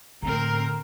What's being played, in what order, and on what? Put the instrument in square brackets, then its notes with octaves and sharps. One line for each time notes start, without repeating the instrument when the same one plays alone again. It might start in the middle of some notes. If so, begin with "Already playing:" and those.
[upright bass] A2 [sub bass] D3 [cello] C4 A#4 [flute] A#5